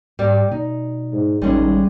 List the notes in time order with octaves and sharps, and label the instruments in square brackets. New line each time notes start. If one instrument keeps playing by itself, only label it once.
[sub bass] G#2 [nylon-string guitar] G3 D5
[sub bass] B2 [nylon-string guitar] D#4
[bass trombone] G#2
[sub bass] A1 [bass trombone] D#3 [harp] G3 [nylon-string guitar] G#3 C#4 G#4